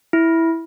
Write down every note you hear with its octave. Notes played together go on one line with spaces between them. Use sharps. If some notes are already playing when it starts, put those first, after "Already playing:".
E4